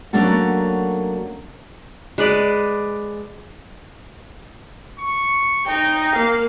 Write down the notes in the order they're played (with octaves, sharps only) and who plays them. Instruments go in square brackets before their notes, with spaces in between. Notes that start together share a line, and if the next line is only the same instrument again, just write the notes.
[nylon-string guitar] F#3 A3 A#3 C#4 D4 F#4
[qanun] G#3 B4 D5
[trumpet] C#6
[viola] D#4 [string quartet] G5 [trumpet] A#5
[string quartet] A#3 [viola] F5